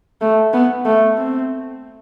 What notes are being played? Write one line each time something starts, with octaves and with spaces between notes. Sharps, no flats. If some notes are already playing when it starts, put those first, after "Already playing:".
A3
B3
A3
C4